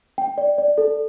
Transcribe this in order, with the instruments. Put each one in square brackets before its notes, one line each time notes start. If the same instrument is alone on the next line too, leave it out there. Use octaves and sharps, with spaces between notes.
[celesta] G5
D5
D5
A4